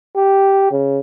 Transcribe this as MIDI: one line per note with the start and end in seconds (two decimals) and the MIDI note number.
0.16 0.67 67
0.71 1.00 49